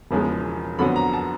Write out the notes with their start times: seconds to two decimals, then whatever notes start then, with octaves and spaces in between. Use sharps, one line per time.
0.11 E1 E2 C#3 F3 G#3
0.79 F2 D3 F#3 B3 B5
0.96 A#5
1.13 A5